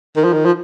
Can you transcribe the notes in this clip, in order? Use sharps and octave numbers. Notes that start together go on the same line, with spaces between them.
D#3
F3
D#3
F3